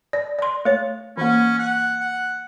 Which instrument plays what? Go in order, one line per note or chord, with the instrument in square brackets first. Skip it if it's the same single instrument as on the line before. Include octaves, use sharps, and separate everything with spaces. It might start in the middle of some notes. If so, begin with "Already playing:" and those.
[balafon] D5
D5 C6
A3 C#5
[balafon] E3 A#3 [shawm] C#4
[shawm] F#5
F#5